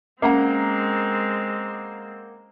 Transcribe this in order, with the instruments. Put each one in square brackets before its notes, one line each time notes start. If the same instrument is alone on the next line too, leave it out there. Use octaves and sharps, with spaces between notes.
[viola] G#3 C4 [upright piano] A#3 F#5 A#5 [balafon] C#4